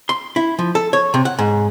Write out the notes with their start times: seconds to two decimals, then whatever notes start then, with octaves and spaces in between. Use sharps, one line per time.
0.09 C6
0.36 E4
0.59 F3
0.75 A4
0.93 C#5
1.14 C3
1.25 F#5
1.39 G#2